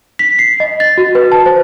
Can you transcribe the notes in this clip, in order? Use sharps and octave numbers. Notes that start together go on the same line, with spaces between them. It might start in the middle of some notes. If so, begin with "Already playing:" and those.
B6
C7
D#5
A6
F#4
B4
A5
C5